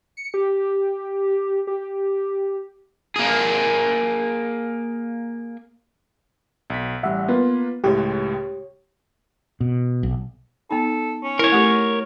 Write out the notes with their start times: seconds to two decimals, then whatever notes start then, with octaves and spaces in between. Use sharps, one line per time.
0.17 C#7
0.34 G4
1.67 G4
3.16 A#3 G#4
6.70 B1 B6
7.03 A1 G3 E5 F#5
7.28 A#3 B3 F4 B4
7.84 C#2 A2 G#3 G4 C#5
9.61 B2
10.03 B1
10.71 B3 D#4 A4
11.23 C#4
11.39 E4 A#4 C#5
11.52 A3 G4 A4